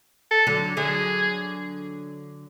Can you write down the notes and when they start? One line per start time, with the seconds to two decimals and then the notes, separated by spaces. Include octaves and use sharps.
0.31 A4
0.47 D3 F#3
0.77 D3 F#3 G#4